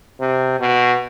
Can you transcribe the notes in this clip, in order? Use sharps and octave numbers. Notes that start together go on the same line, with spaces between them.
C3
B2